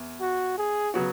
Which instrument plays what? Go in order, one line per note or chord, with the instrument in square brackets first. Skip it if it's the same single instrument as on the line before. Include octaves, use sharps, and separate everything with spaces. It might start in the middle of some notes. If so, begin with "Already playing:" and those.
Already playing: [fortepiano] E2
[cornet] F#4
G#4
[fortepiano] C#3 F#3 B3 F#4